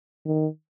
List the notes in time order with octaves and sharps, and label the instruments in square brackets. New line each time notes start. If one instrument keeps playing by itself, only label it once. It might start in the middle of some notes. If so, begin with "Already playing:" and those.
[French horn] D#3